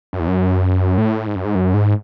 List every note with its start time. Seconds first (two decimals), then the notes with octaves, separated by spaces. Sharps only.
0.13 F#2
0.20 E2
0.28 F#2
0.98 A2
1.27 G#2
1.36 F#2
1.45 G#2
1.55 F#2
1.74 G#2